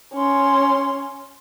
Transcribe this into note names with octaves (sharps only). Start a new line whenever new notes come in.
C#4 C6